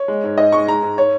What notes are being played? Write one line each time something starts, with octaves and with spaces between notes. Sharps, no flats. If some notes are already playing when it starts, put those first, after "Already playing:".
Already playing: C#5
G#3
G#2
G#2 D#5
G#3 C#6
G#3 A#5
G#2
C#5